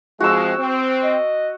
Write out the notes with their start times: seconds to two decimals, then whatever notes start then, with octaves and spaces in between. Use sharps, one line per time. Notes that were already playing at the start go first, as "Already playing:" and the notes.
0.20 F3 G#3 C4 F#4 E6
0.58 C4
1.03 D#5